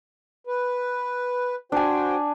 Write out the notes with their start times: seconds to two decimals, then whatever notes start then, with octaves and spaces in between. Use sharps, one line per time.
0.47 B4
1.72 D4 F#4 C5 G5 G#5